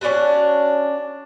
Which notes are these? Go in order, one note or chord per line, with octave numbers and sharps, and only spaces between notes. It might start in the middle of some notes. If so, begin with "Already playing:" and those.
C#4 D4 F4 F#4